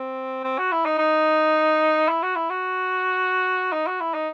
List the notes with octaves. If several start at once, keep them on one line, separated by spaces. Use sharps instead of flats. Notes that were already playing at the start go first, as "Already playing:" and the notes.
Already playing: C4
C4
F#4
E4
D#4
D#4
E4
F#4
E4
F#4
D#4
F#4
E4
D#4